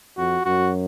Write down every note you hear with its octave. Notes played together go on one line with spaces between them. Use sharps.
F2 F#4
F#2 F#4